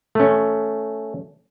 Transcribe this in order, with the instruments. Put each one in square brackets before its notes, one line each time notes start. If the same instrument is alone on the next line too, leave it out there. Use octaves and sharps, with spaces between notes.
[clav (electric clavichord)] A3 C#4